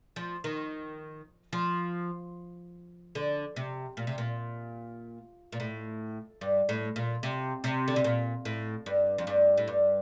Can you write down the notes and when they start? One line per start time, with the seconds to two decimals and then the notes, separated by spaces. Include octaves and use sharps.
0.16 F3
0.44 D#3
1.53 F3
3.15 D3
3.56 C3
3.97 A#2
4.07 C3
4.18 A#2
5.52 A#2
5.60 A2
6.41 G2
6.69 A2
6.96 A#2
7.23 C3
7.64 C3
7.88 D3
7.96 C3
8.04 A#2
8.45 A2
8.86 G2
9.18 F2
9.27 G2
9.58 A2
9.68 G2